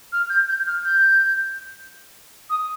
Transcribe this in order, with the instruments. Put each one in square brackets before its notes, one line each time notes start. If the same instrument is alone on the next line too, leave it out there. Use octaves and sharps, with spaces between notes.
[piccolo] F6
G6
G6
F6
G6
D#6